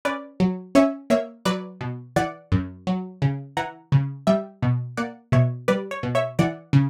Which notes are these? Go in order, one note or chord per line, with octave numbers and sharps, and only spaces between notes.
C#4 B4 D5
F#3
C#4 C#5 E5
A#3 C#5 E5
F#3 B4 D5
B2
E3 D5 F#5
F#2
F#3
C#3
E3 F#5 A#5
C#3
G3 E5 G5
B2
A#3 D5 F#5
B2 C#5 E5
G3 B4 D5
C#5
B2
C#5 E5
E3 D5 F#5
C#3